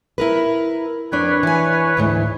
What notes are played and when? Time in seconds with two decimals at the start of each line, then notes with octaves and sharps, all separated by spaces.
0.18 E4 A#4 B4
1.12 F2 D4 B4 C#5
1.43 E3 G#5
1.97 D2 G#2 E3